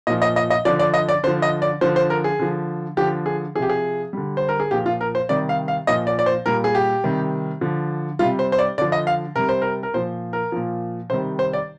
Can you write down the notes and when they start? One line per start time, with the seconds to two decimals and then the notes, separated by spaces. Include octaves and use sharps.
0.07 A#2 F3 D#5
0.22 D#5
0.36 D#5
0.50 D#5
0.65 D3 F3 D5
0.79 D5
0.94 D#5
1.09 D5
1.23 D3 C5
1.27 F3
1.42 D#5
1.62 D5
1.81 D3 F3 C5
1.96 C5
2.10 A#4
2.24 G#4
2.39 D3 F3
2.97 D3 F3 G4
3.26 G#4
3.55 F3 G#4
3.59 C3 G4
3.69 G#4
4.13 D3 G3
4.37 C5
4.49 A#4
4.60 G#4
4.71 A#2 F3 G4
4.86 F4
5.01 A#4
5.15 C5
5.29 C3 D#3 G3 D5
5.49 F5
5.68 F5
5.87 A#2 F3 D#5
6.07 D5
6.19 D5
6.26 C5
6.46 A#2 G3 A#4
6.64 G#4
6.75 G4
7.04 C3 D#3 G3
7.61 D3 F3
8.19 C3 G3 F4
8.39 C5
8.52 C5
8.59 D5
8.78 D3 D5
8.82 F3
8.92 D#5
9.07 F5
9.35 C3 G3 A#4
9.49 C5
9.62 A#4
9.83 A#4
9.94 A#2 F3 C5
10.33 A#4
10.52 A#2 F3
11.10 C3 D#3 G3 C5
11.39 C5
11.53 D5